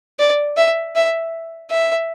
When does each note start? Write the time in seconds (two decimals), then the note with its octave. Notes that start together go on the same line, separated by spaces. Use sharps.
0.19 D5
0.57 E5
0.96 E5
1.70 E5